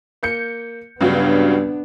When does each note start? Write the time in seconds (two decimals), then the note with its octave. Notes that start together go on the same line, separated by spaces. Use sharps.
0.23 A#3 G6 C#7
1.01 C#2 G2 C#3 F#3 B3 D4